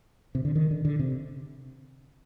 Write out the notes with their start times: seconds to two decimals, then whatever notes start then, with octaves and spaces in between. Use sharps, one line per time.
0.35 C3
0.45 D3
0.55 D#3
0.71 D3
0.85 D3
1.00 C3